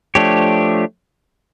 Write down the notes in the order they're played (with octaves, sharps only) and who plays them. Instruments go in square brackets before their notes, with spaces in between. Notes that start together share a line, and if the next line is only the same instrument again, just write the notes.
[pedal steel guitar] F3 A3 D4 G4 C#5